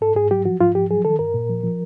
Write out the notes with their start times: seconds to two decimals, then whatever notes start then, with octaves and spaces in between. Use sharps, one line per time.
0.01 G#2 A4
0.16 G#2 G#4
0.31 F#3 G4
0.45 F3 F#4
0.61 G#2 F4
0.75 F3 G4
0.90 F#3 G#4
1.05 D#3 A4
1.19 G2 A#4
1.34 A#2
1.49 F3
1.64 F3